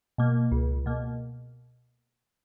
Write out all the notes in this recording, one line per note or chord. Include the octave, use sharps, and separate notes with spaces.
B2 A#3
C#2
B2 A#3